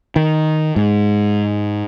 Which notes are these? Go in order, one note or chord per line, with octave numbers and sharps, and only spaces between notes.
D#3
G#2